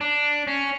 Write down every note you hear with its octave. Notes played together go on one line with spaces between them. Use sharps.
D4
C#4